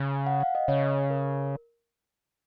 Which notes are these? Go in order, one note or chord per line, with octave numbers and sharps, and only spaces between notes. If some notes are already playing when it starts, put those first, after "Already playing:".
Already playing: C#3
F#5
F5
D#5
C#3 C#5
A#4